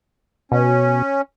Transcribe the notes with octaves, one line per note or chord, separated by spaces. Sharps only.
B2 C#4